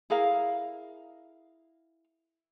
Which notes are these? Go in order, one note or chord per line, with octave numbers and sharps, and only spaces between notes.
E4 G#4 A#4 F5